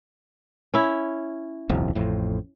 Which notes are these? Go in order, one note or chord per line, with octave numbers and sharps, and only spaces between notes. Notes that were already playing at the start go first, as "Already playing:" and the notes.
C#4 E4
D#1 C2 F2
A1 F2 A2